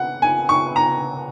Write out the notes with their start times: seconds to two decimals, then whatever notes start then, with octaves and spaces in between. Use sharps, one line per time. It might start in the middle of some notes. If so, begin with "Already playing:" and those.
Already playing: F#5
0.22 G#5
0.49 C#6
0.76 A#5